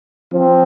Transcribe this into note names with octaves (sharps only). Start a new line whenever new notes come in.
F3 C4